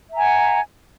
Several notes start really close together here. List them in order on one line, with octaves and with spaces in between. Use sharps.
E5 A#5 G#5 F#5